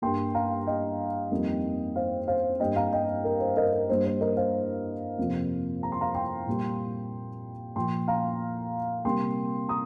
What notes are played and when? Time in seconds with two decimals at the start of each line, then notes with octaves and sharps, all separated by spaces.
0.02 G2 G3 A#3 G5 C6
0.34 F5 A#5
0.66 D#5 G5
1.31 F2 D#3 G3 A#3
1.96 C5 F5
2.28 C5 F5
2.60 G2 G3 A#3 D#5 G5
2.76 F5 A#5
2.93 D#5 G5
3.24 A#4
3.40 C5
3.57 A#4 D#5
3.73 A#4
3.89 G2 G3 A#3 C5
4.05 C5
4.21 A#4 D#5
4.37 C5 F5
5.18 F2 C3 F3 A#3
5.83 A#5
5.92 C6
6.01 F5 A#5
6.14 G5 C6
6.47 A#2 G3 A#3
7.76 A#2 F3 A#3 G5 C6
8.08 F5 A#5
9.05 C3 G3 A#3 G5 C6
9.69 A#5 D#6